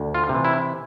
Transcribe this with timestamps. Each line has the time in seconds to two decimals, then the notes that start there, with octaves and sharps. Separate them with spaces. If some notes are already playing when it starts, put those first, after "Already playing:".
Already playing: D2
0.14 F4
0.29 C3
0.34 E3
0.44 E4